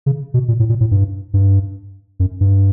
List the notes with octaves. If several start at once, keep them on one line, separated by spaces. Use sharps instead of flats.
C#3
B2
A#2
A2
A#2
A2
G2
G2
F#2
G2